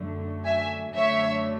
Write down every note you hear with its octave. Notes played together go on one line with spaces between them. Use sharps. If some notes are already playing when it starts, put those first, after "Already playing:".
Already playing: F#2 D3 F#3 A3
E5 G#5
F#2 D3 F#3 A3 C#5 E5